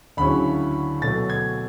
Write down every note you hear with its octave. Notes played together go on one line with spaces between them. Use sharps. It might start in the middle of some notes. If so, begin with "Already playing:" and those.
D2 C#3 F#3 C#4 E4 B5
B2 F#3 A3 A6
G#6